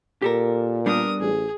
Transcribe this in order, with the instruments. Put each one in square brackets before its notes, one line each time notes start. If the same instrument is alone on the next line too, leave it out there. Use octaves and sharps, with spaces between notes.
[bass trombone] A#2 [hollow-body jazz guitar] G4 A4 A#4
[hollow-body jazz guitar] G3 B3 D4 [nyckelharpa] A#4 D#6
[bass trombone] A1 [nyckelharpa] G#4